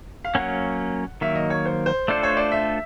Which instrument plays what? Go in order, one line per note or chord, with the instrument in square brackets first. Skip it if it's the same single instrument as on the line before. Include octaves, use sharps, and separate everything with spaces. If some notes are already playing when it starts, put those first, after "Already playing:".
[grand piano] F5
[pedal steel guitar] F#3 A#3 C#4 [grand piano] F#5
[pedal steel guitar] D#3 F#3 A#3 [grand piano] E5
[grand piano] D#5
C#5
C5
C5
[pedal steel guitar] A3 D4 F4 A4 C5 [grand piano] D5
[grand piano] C#5
D5
E5